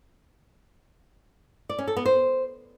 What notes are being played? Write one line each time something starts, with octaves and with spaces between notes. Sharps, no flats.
D5
C#4
A4
B3
C5